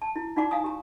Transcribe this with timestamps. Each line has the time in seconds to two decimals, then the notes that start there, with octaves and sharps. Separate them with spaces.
0.02 A5
0.16 E4
0.36 D#4 F4 D5 F#5 A#5 D6
0.51 F5 G#5 A#5 D#6
0.64 G4 A#5